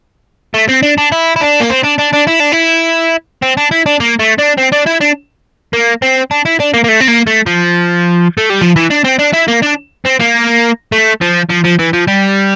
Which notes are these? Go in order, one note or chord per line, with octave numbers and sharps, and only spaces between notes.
A3
C4
D4
D4
E4
E4
D4
A#3
C4
D4
D4
D4
E4
D4
E4
C4
D4
E4
D4
A#3
A3
D4
C4
D4
E4
D4
A#3
C4
D4
E4
D4
A#3
A#3
A3
C4
A#3
A3
F3
A3
G3
F3
E3
D4
C4
D4
E4
A#3
D4
C4
A#3
A3
F3
F3
F3
E3
F3
G3